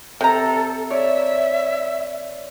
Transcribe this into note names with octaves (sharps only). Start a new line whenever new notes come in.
C3 A4 A#5
C#5 D5 E5